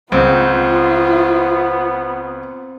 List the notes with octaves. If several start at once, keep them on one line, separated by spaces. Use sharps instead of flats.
C#2 B3 C4 F4